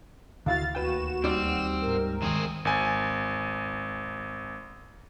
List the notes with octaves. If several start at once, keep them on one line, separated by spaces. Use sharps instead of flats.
D2 D3 E4 F#4 F5 A6
D#2 F#4 B4 G5 E7
G3 C4 D#4 D5
G#2 A#4
D#2 D#3 C4 G#4
G#1 G#5